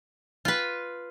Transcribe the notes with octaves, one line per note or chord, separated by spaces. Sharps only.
F4 B4